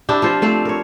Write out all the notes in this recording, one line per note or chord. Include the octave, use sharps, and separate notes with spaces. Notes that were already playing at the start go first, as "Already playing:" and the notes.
C4 D4 E4 G4
F3 F4 C5
A3 C4 F5
A#4 C#5